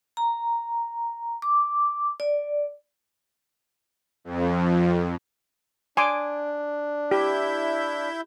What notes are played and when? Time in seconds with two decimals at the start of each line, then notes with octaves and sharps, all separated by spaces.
0.17 A#5
1.42 D6
2.20 D5
4.24 F2
5.97 D4 G#5 C6 D6
7.11 E4 G4 E5 G6